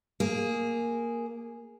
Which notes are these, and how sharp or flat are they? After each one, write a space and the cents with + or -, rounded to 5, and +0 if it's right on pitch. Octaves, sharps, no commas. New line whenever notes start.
A#3 +0 G#4 +0